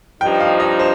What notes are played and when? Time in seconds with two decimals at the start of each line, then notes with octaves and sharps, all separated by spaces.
0.21 G2 F3 D#4 G5
0.40 F5
0.60 D#5
0.79 C5